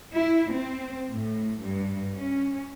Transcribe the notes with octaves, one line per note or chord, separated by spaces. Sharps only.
E4
C4
A2
G2
C#4